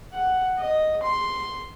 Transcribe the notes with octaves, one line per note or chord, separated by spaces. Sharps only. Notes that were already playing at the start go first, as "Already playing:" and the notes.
F#5
D#5
C6